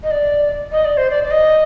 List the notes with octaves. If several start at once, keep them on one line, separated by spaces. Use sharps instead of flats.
D#5
D5
D#5
D5
C5
D5
D5
D#5